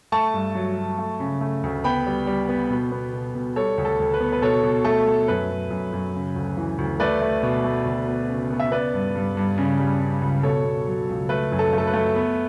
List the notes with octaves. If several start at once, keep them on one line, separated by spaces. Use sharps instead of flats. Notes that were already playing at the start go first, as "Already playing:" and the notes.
A3 A5 C#6
G2
F#3
F#3
A3
C#3
A3
D2
B3 G5 B5
G3
G3
B3
B2
B3
B2
B2
G3 A4 C#5
D2
A4
D2
B4
B3
B4
B2 A4 C#5
B2
A3 A4
A3
F#2 B4
F#2
F#2
F#2
C#3
D2
E3
D2
A3 B4 D5
A3
B2
A3
D2
B3
C#3
B3
E5
B3 B4 D5
G2
G2
G2
C#3
G3
C#3
C#2
B2 A4 C#5
B2
F#3
C#2
A3 B4
F#2
A4
A3 A4
B4
A3
B3